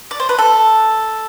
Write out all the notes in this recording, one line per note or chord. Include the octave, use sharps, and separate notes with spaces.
D5
C5
B4
A4